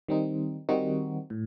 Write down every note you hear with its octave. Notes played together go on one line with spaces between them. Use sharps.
D#3 G3 C4 D#4
D#3 G3 C4 D#4 F#4
A2